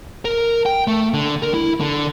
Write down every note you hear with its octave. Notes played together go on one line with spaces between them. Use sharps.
A#4
G5
A3
D3
A#4
E4
D3